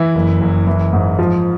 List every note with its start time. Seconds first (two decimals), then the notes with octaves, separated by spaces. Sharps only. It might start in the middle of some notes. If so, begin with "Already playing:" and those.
Already playing: E3 E4
0.15 F#1
0.41 F#1
0.67 E3
0.93 G#2
1.19 F3